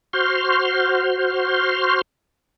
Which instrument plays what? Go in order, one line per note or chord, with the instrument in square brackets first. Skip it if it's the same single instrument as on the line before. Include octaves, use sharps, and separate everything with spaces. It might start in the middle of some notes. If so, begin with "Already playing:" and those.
[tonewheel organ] F#4 C5 C6 F6